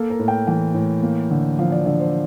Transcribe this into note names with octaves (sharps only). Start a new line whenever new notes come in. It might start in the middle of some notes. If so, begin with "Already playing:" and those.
Already playing: A#3 A4
A#4
A2
G5
E3 G5
A2
A#3
D3
F3 F5
D5
D3 D5
C5